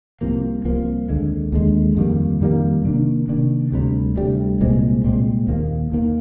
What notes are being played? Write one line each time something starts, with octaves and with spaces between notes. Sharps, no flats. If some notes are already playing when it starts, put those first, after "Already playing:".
C2 C3 F3 A#3
C2 C3 F3 A#3
D#2 D3 G#3
D#2 D3 G#3
F2 D#3 G3 A#3
F2 D#3 G3 A#3
C3 D#3 A#3 D4
C3 D#3 A#3 D4
D2 C3 G3
D2 C3 G3
C2 A#2 G#3 C4
C2 A#2 G#3 C4
D#2 D#3 A#3
D#2 D#3 A#3